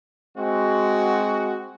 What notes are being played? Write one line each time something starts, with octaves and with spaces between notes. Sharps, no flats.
G#3 C4 F#4